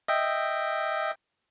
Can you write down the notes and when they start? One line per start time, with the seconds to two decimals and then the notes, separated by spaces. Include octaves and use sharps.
0.08 D#5 E5 G5